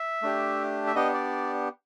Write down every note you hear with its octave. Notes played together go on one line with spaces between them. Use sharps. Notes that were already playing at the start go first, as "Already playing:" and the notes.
Already playing: E5
A3 D4 G4
E5
B3 D4 G4 D#5
D5